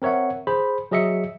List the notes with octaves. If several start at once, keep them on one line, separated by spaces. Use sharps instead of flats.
C4 A#4 C#5 E5 F#5
G#4 C5 B5
F#3 G#4 D#5 E5 C#7